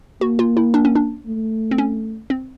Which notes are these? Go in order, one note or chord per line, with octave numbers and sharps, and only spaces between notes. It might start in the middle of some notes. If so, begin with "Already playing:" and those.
A#3 F#4
F4
E4
D4
C#4
D4
A3
C4
C#4
C4